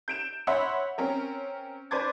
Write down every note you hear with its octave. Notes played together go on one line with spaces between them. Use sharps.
G6 D7 E7
C#5 E5 F#5 B5 C6
C4 C#4 A#4
B4 C5 D5 D6 G#6 A6